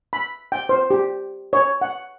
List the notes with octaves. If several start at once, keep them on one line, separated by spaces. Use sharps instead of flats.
B5
G5
C5
G4
C#5
F#5